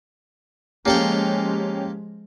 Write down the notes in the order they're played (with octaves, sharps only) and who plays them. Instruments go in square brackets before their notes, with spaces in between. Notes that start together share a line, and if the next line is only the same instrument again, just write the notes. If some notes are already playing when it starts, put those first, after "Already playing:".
[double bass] F3 G#3 [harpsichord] A#3 A4 G5 [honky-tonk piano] C#4 G4